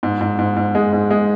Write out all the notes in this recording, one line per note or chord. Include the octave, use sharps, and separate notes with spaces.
G#2
G#2
G#2
G#2
G#3
G#2
G#3